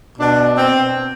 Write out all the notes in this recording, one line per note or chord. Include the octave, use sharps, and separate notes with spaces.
B2 D4
C4